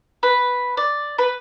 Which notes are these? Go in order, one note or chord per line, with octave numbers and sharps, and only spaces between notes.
B4
D5
B4